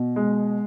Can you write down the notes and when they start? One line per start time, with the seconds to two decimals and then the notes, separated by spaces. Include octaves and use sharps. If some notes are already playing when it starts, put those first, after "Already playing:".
Already playing: B2
0.16 G#3